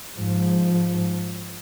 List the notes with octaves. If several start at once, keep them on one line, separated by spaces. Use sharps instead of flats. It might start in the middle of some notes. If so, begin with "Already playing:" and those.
G#2 F3